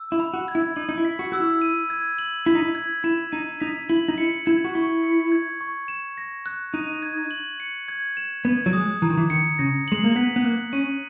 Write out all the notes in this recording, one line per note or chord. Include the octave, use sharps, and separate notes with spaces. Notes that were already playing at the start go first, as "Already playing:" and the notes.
Already playing: E6
E4
B5
F#4
G#6
E4
D#4 F#7
D#4
E4
B6
F#4
F#4 E6
E4
D#7
G#6
F#7
E4 B6
D#4
E4
G#6
E4 E7
D#4 D#7
D#4 B6
E4 F#7
D#4
E4 C#7
E4 G#6
F#4
E4 C#6
C#7
G#6
C#6
E7
A#6
F#6
D#4 D#7
G#6
F#7
C#7
G#6
E7
B3 G#6
F#3
G#3 D#6
E3 A#5
D#3
E3
D#3 C#7
C#3 A#6
G#3 F#7
A#3
B3 B6
B3
A#3 F#6
C#4 D#7